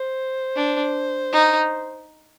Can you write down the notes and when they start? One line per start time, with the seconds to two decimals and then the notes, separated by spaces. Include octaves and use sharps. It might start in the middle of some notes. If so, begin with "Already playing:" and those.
Already playing: C5
0.56 D4
1.33 D#4